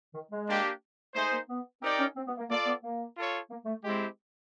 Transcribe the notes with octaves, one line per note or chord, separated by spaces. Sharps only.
D#3
G#3
A#3 D4 G4
A3 D#4 G#4 C5
A#3
B3
C4 D#4 G4 A#4 D5 G5
C#4
C4
B3
A#3
A#3 F4 A4 D5
B3
A#3
F4 A4 C#5
A#3
A3
G#3 C4 E4 G4